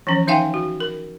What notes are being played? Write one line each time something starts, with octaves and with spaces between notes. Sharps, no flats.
E3 F3 C#4
D#3 D#4 E5 F5 G5 G#5
F#4
A#4